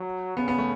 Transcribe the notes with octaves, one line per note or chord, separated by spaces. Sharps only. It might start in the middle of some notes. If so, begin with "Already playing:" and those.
Already playing: F#3
C#3 B3
B3
A3